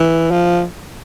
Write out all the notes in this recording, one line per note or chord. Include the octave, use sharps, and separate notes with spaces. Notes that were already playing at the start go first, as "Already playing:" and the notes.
Already playing: E3
F3